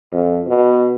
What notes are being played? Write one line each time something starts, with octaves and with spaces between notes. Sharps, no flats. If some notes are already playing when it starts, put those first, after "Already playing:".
F2
B2